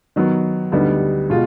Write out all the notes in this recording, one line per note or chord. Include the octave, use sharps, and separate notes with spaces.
D#3 F#3 B3
D2 D3 G3 B3 D#4
B2 G#3 F4